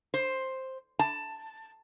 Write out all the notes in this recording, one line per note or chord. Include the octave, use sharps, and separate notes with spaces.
C5
A5